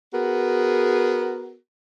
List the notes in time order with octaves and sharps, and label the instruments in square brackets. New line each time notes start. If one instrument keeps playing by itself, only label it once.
[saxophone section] B3 F#4 G#4 A#4